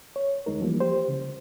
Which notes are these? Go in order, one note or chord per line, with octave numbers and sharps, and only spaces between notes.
C#5
D2 G#3 D#4 A#4
E3 F3 G3 A#3
G4 C5
C#3